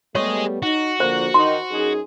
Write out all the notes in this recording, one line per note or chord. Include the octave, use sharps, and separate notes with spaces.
G3 A3 B3 G#4 C#5 D#5 C#6
D#4 F#4
D3 F3 A#3 C5
D#3 D#4 C6
F#2 D#4 G#4